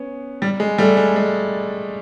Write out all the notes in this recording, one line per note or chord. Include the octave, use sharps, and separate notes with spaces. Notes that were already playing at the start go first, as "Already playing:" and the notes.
Already playing: B3 C#4
G3
G#3
G3 A3
G#3
G#3